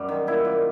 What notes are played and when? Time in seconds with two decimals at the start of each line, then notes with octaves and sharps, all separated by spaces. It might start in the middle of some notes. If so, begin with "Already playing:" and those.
Already playing: F#2 G3
0.09 D#3
0.27 A#2 E4
0.45 A#2